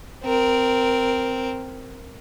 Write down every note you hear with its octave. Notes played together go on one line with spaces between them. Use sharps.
C4 A#4